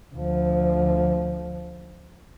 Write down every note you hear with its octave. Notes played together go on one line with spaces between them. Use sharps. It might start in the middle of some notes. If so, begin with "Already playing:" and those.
D2 F3